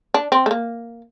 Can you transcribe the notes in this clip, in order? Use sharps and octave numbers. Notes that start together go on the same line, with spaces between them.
D4
C4
A3
A#3